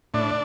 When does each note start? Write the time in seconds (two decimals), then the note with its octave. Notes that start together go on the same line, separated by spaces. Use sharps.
0.14 A2 D4